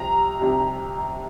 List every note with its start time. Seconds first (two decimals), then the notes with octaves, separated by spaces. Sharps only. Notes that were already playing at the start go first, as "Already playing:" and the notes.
Already playing: C2 C3 F3 A#5
0.39 C2 C3 F3